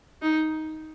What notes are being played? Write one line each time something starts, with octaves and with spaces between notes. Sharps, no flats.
D#4